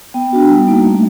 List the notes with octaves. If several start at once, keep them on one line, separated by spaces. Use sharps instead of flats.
B3 G5
D4 F#4
G3
A#3 D#4
A3